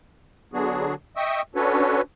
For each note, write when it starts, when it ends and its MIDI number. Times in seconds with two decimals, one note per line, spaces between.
0.53 0.94 50
0.53 0.94 54
0.53 0.94 59
0.53 0.94 62
0.53 0.94 66
0.53 0.94 68
1.17 1.42 75
1.17 1.42 76
1.17 1.42 79
1.17 1.42 85
1.17 1.42 87
1.17 1.42 88
1.55 2.01 61
1.55 2.01 62
1.55 2.01 66
1.55 2.01 69
1.55 2.01 71
1.55 2.01 73